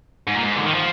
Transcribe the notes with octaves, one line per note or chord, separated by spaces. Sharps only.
G#2
A#2
G#2
D3
D#3
F3